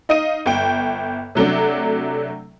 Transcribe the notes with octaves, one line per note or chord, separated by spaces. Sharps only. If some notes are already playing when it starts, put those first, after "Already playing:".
D#4 D#5 F5 D#7
G1 G5
C3 F#3 A3 D4